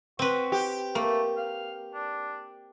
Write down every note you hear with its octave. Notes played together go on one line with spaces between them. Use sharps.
C4 F#4 B4
G4
A3 A#3
F5
D4